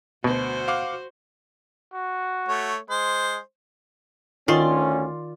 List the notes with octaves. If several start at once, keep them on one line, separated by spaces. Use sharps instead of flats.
D2 B2 F#4 C5
F5 F#5 D6
F#4
A3 C#5
G#3 C5
D2 D#3 C#4 F4 D5 C6